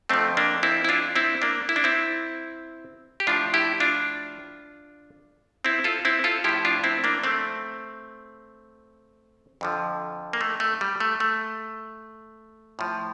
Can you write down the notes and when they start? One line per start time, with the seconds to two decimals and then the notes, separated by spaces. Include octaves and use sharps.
0.09 F2 D3 F3 A3 C4
0.37 A#3 D4
0.63 C4 E4
0.84 E4
0.89 D4 F4
1.16 C4 E4
1.42 A#3 D4
1.69 E4
1.76 D4
1.84 C4 E4
3.20 G4
3.27 A2 F3 D4 F4
3.54 E4 G4
3.80 D4 F4
5.65 C4 E4
5.84 F4 A4
6.05 C4 E4
6.24 F4 A4
6.44 A2 F3 E4 G4
6.65 D4 F4
6.84 C4 E4
7.04 A#3 D4
7.24 A3 C4
9.61 F2 D3 F3
10.33 A#3
10.41 A3
10.60 A3
10.81 G3
11.00 A3
11.20 A3
12.79 A2 F3